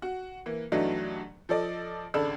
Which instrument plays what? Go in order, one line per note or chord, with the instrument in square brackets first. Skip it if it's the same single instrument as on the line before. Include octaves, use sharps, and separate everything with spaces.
[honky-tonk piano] F#4
E3 A#3
G2 E3 F#3 A3 D4 D#4
F3 A4 D5 D#5
G#1 C#3 D4 A4 B5 E6